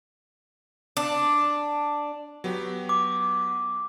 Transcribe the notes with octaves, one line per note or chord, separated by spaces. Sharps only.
D4
F#3 B3 G4
D6